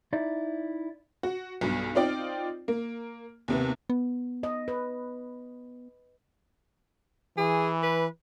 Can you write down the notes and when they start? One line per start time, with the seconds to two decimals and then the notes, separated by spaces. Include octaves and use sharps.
0.13 D#4 E4 D5
1.23 F#4
1.61 B1 G2 B2
1.95 C4 D#4 F4 D5 G5
2.68 A#3
3.48 D#2 C3 B3
3.90 B3
4.43 D#5
4.68 B4
7.38 E3 G#4
7.83 B4